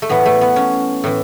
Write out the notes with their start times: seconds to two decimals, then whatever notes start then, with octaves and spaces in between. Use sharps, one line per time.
0.02 A3
0.09 A2 E3 B3
0.26 A3
0.41 B3
0.56 C#4
1.04 A2 E3